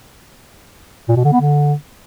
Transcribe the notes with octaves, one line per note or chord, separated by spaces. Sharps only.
A#2
B2
D3
B3
D3